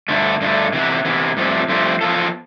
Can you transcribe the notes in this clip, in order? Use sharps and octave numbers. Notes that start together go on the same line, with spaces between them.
G2 D3 A3
G2 D3 A3
C3 E3 B3
C3 E3 B3
G2 F3 A3 C4 G4
G2 F3 A3 C4 G4
F3 B3 F4 A4